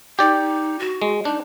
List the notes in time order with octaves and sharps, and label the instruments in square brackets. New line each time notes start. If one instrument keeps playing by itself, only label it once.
[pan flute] D#4 [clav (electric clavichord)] G4 D5
[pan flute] F#4
[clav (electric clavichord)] G#3
[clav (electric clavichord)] D4 [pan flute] D#4